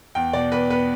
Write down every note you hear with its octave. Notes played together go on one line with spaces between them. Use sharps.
E2 G5
B2 D5
E2 B4
B3 B4